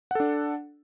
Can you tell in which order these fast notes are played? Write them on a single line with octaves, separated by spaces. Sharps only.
F#5 A4 D4